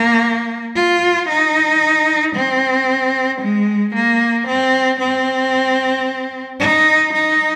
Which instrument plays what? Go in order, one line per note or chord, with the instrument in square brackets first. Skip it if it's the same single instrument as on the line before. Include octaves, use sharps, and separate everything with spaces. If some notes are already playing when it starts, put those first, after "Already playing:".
Already playing: [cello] A#3
F4
D#4
C4
G#3
A#3
C4
C4
D#4
D#4